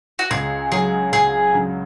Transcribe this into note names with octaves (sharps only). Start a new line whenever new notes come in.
F#4
C#2 G#4
C#3 F#3 G#4
C#2 G#4
C#3 F#3